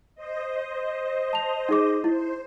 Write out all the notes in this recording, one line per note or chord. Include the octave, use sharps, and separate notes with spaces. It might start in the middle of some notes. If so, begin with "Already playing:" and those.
C5 D#5
A5 F7
D#4 G#4 D6
E4 C5